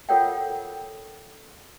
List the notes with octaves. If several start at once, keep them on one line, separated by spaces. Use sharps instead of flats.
F4 A4 A#4 C#5 F#5 G5